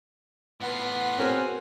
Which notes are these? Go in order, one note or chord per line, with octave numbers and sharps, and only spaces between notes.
A2 B3 F4 F#5
C4 C#4 F#4 G#4 A#4 G#5